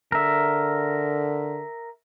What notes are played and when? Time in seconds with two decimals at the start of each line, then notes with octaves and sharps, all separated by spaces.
0.12 D3 A#4 E5